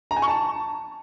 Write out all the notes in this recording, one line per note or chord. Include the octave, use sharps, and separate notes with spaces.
A#5
G#5
C#6
A5